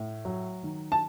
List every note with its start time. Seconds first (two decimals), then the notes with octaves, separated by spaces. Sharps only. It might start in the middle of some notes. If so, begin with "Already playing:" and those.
Already playing: A2
0.25 F#3
0.63 D#3
0.92 A5